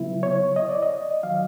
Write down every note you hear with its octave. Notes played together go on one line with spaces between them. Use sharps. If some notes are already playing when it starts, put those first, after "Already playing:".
Already playing: C#3 F#3 B3 E4
C#5
D#5
D5
D#5
D#3 F#3 F5